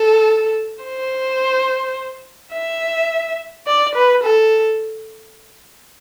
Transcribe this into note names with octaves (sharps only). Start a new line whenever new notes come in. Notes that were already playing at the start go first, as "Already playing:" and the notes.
Already playing: A4
C5
E5
D5
B4
A4